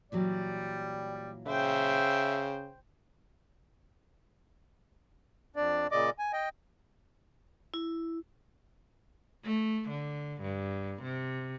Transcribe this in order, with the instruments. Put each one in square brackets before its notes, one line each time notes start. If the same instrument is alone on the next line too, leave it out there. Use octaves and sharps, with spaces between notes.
[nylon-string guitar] A#2 E3 F#3 [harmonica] G3 D5
[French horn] C#3 [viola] C5 G5 [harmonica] E5
[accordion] F2 D4 D5
A#2 C#3 D5 D#5 D6
G#5
D#5 G5
[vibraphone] E4
[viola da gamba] A3
D3
G2
C3